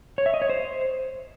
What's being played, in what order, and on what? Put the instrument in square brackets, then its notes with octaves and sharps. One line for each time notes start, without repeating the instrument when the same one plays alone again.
[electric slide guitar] C#5
E5
D#5
C#5
C5